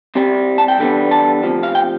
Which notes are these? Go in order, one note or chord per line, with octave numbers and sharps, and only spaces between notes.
C2 C3 G3
A5
G5
E2 D3 G3 B3
A5
D2 C3 F3
F5
G5